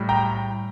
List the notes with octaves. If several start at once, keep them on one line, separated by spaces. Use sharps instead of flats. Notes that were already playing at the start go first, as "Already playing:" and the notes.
Already playing: A2 G3
G5 A#5